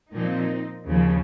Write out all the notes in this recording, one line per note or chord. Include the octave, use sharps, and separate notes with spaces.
A#2 F3 C4 D#4
D#2 C#3 F3